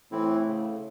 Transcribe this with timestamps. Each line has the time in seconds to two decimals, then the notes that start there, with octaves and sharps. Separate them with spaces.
0.12 A2 E3 C4 E4
0.47 C#3